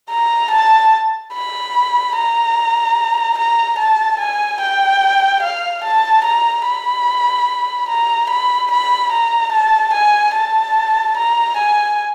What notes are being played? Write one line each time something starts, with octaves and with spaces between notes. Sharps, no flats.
A#5
A5
B5
A#5
A#5
A5
G#5
G5
F5
A5
A#5
B5
A#5
B5
B5
A#5
A5
G#5
A5
A#5
G#5